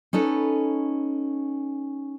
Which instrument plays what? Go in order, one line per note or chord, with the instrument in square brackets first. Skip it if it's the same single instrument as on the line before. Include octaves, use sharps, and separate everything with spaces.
[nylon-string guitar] C#4 D#4 A4 B4